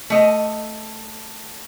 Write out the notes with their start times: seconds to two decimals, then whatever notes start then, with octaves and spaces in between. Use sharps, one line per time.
0.10 A3 D#5